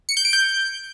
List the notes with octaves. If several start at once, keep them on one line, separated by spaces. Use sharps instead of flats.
C#7
G6
D7
G6